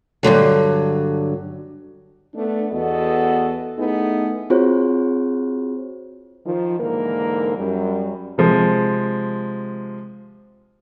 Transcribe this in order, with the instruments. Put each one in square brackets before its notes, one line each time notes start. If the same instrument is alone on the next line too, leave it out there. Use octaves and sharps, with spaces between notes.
[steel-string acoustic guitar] G2 A#2 D3 F#3
[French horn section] A3 B3 D4
E2 B3 F#4 A4 D#5
A3 B3 D#4 E4 G#4
[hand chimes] C4 F4 F#4 G#4 C5 C#5
[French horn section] D#3 F3
G#2 D3 E3 A#3 A#4
F#2 G3
[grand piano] C3 F3 G#3